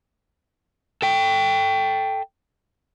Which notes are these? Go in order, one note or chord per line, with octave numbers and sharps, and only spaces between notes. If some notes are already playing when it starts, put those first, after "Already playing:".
A4 G5